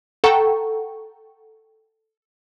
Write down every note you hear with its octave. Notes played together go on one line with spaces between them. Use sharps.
A4 F#5 G5 A#5 C#6